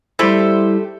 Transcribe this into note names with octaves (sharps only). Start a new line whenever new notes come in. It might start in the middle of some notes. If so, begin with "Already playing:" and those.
G3 A3 E4 G4 C5